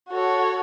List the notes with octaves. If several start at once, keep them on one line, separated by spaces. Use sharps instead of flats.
F#4 A4 C#5